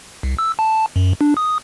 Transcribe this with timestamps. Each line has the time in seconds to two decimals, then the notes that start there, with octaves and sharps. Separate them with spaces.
0.23 C2
0.39 E6
0.59 A5
0.96 F#2
1.21 D4
1.37 D#6